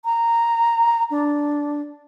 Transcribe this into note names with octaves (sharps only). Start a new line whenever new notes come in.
A#5
D4